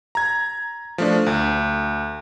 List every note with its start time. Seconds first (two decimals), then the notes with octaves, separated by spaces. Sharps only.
0.15 A#5 G#6
0.98 F3 A3 D4
1.26 D2